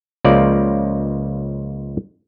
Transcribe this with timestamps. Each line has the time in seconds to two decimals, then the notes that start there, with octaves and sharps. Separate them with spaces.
0.25 C#2 C#3 F3 A#3 D5